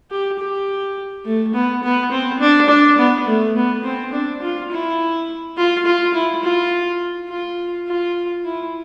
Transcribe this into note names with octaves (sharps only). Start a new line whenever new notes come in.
G4
G4
A3
B3
B3
C4
D4
D4
B3
A3
B3
C4
D4
F4
E4
F4
F4
E4
F4
F4
F4
E4